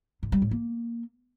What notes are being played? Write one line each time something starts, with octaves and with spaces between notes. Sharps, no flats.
G#2
G3
A2
A#3